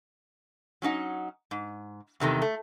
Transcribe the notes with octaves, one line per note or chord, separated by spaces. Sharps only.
F#3 C#4 D#4 F#5
G#2
E2 C3 D#3 A3
A3